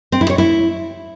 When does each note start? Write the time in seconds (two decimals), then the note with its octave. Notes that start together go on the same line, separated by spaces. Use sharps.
0.12 C4
0.21 E4
0.30 C#5
0.38 E4